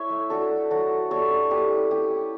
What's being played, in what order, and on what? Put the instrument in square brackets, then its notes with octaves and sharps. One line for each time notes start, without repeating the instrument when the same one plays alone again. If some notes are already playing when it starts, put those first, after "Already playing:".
Already playing: [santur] E4 A4 C#5 E5
A3
D4 F#4 A4
A3
F#3 F#4 A4
F#3
G3 A4 C#5
D4
E4 G4 B4
C#4
A3 G4
E4